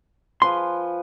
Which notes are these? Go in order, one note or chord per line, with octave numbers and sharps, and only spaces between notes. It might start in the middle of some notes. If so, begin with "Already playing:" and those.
F3 B4 G#5 C6